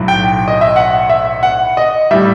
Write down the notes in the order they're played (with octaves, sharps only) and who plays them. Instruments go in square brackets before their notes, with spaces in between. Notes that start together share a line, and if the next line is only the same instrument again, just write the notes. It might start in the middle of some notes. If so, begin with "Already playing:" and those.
Already playing: [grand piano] B1 A2 F#3
G5
D#5
E5
F#5
E5
F#5
D#5
A2 G3 E5